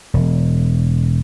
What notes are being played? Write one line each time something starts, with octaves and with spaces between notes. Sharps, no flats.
E1